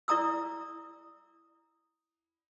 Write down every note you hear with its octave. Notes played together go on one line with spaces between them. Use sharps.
E4 D5 A#5 D#6 E6